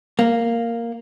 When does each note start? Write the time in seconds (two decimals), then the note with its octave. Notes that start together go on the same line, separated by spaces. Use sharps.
0.19 A#3